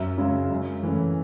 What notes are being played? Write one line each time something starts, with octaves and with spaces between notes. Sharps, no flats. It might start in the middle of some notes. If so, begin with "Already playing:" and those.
Already playing: F#2 E5
C#3 G#3
F#2
E3 A3 C#4